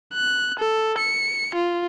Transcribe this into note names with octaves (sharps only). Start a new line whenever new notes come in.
F#6
A4
C#7
F4